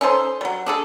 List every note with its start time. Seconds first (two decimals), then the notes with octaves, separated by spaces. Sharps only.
0.01 C#4 D#4 A4 C5
0.41 F#3 G3
0.66 D4 G#4 A4